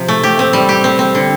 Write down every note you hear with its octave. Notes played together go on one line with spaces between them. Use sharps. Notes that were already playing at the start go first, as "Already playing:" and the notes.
Already playing: C3 F3
A3
G4
C4
G3
G4
C4
C4
D3